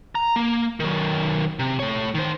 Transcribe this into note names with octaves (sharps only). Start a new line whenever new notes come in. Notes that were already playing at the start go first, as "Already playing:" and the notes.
A#5
A#3
D#3 F#3
C3
A3 C#5
D#3 C5